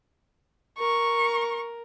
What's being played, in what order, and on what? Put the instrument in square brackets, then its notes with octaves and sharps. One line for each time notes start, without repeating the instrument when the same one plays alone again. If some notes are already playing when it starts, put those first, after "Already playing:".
[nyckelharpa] A#4 [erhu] C#6